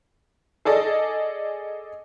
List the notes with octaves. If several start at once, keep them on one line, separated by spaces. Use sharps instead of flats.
G#4 A4 D5 D#5